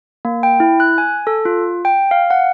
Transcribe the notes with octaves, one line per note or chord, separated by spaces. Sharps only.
A#3
G5
E4
F#6
G#5
A4
F4
G5
F5
F#5